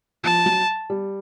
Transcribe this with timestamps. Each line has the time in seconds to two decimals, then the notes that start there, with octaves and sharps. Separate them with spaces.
0.24 F3 A5
0.46 F#3
0.90 G3